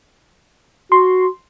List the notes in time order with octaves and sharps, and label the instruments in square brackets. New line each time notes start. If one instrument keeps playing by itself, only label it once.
[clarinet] F#4 [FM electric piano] C6